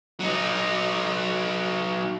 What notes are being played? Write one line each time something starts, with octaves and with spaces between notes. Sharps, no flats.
F#3 D#4